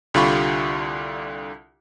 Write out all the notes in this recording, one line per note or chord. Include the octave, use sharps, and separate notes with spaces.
C2 D3 F4 G4 B5 C#6